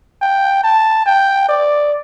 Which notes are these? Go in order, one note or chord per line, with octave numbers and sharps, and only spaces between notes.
G5
A5
G5
D5